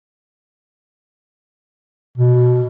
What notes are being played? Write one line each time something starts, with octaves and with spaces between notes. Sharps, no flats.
B2